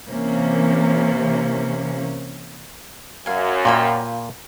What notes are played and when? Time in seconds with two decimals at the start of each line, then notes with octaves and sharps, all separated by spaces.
0.10 C3 E3 A#3 C#4
3.26 F#2 F5 G#5
3.65 A#2 A#3 F4 G5 B5